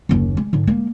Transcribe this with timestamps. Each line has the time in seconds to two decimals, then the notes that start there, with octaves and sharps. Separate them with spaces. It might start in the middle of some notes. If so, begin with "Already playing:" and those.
0.09 F#1 D#2
0.37 G#3
0.53 G#2 D3
0.67 G#3 A#3